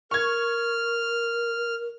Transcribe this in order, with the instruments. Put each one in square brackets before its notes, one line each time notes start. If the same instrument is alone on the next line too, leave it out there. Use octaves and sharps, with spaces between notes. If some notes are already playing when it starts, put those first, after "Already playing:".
[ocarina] A#4 [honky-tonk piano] C#6 G#6 [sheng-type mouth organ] F6